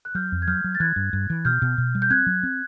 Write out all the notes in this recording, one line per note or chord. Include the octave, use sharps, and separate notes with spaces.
F#6
F#3 F6 G6
F2
G#6
F#3 F6 G6
F#3
A6
E3 F#6 G#6
G2
G2
E3
B2 F6 G6
B2
B2
G3
G6
C4 F#6 G#6
F#3
C4